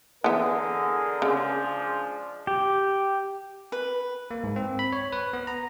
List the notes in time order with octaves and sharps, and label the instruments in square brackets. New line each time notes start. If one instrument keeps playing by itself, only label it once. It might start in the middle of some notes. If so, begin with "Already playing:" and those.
[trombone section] D3 G#4 A#4 [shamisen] E3 B3
[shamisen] C#3 [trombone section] F3 G#3 D4
[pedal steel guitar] G4
[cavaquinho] B4
[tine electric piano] A#3
G#2
C4
B5
C#5
B4
B3
A#5